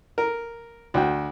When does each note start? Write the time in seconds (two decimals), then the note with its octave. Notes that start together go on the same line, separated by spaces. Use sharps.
0.18 A#4
0.94 D2 F#4 G5